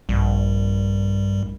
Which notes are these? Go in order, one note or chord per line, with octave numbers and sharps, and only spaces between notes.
A#1 G2 G3